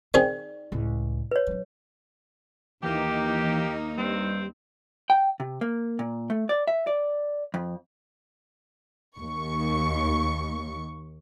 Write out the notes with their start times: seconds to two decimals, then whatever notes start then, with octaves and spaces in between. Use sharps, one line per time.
0.14 D#3 C4 D#4 G#4 D5
0.72 C#2 A2
1.31 B4 C#5
1.47 F#3 D4
2.83 D#2 E3 A#3 D#4 G4
3.98 G2 G3 C4
5.10 G5
5.40 C3
5.61 A#3
5.99 A#2
6.30 A3
6.49 D5
6.68 E5
6.87 D5
7.54 F2
9.19 D#2 C#6